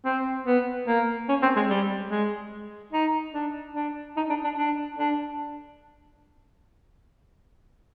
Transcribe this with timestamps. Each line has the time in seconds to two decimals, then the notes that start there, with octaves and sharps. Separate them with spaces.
0.06 C4
0.47 B3
0.87 A#3
1.29 C#4
1.42 C4
1.56 G#3
1.69 G3
2.10 G#3
2.93 D#4
3.34 D4
3.75 D4
4.17 D#4
4.30 D4
4.44 D4
4.58 D4
4.99 D4